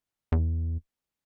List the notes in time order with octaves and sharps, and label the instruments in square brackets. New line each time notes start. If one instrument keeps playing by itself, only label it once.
[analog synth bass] E2